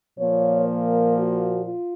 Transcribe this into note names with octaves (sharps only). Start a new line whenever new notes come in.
A#2 F3 A#3 C#5
A#4
F#4
F4